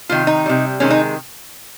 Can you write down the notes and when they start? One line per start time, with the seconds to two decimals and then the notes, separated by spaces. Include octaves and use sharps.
0.09 C3 D#3 G#3 F4
0.27 D#4
0.46 C3 G3
0.80 C3 D#3 G#3 C#4
0.90 D#4